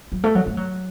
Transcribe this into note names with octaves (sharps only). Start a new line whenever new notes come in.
F#3
A3
F#3
A3
F#3